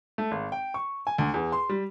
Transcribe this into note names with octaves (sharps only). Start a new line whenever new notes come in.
A3
G#1
G5
C#6
G#5
D2
E2
C6
G3